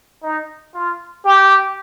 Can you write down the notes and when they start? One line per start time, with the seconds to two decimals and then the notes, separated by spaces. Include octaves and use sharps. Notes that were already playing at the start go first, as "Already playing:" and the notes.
0.23 D#4
0.74 F4
1.25 G4